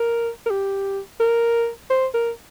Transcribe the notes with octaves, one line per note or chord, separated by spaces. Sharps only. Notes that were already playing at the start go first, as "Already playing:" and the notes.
Already playing: A#4
A#4
G4
A#4
C5
A#4